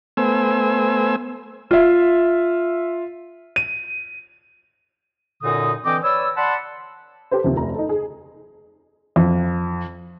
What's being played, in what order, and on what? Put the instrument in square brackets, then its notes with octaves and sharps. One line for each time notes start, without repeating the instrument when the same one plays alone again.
[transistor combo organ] A3 B3 C5 G#5 E6
[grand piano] F4 E5
D#7
[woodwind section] F#2 A#2 D3 D#4 D#6
D3 E3 C4 D#5 G5 D6
B4 C#5 D5 E6
D5 F#5 A5 B5 C6
[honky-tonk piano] G4 A4 B4 C5
D#2 C3 F3
F1 A#5
D#4 A4
G#4
[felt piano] F2